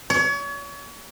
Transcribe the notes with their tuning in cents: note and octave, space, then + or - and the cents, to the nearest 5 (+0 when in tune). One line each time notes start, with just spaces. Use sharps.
C#5 +35